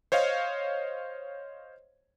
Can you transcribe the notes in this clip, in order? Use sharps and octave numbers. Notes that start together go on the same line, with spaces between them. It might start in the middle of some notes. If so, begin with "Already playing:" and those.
C5 C#5 D#5 F5